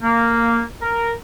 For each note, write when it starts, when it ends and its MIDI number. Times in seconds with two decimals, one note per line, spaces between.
0.02 0.62 58
0.81 1.11 70